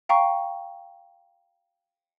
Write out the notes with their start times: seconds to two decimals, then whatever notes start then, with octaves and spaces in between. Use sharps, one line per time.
0.09 F5 G5 A#5 C#6